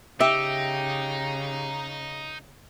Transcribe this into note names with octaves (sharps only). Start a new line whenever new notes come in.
C#3 D#4 G4 E5